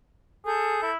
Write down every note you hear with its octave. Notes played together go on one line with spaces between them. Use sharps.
G#4 A4 G6
E4